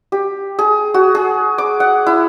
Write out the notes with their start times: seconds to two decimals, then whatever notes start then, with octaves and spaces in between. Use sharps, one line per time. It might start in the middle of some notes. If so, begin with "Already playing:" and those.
0.12 G4
0.59 G#4
0.94 F#4
1.15 G#4
1.58 D6
1.80 F#5
2.06 E4